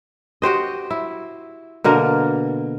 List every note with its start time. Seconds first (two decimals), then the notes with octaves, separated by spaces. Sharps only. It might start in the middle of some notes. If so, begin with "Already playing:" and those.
0.42 F#4 G4 C5 D#5
0.90 E4
1.84 B2 D3 A#3 A#4